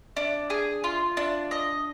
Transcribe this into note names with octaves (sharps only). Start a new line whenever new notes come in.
D4
G#4
F4
D4
D#5